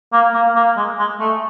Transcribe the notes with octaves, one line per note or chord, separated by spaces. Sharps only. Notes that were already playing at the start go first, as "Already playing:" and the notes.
A#3
A#3
A#3
G#3
G#3
A3